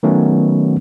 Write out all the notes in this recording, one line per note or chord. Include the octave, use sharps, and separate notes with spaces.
D#3 F#3 A3 B3 C#4